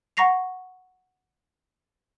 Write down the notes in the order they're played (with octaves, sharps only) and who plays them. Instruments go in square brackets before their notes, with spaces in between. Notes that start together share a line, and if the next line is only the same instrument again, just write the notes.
[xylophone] F#5 A#5 C#6 A#6 C7 F7